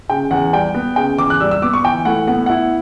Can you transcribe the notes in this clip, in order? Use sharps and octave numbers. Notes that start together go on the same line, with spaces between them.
C#3 G5
E2 F#5
G3 G5
B3
C#3 G5
E2 D6
F#6
G3 E6
E6
B3 D6
C#6
E3 G5
A2 F#5
B3 F#5
E4 F#5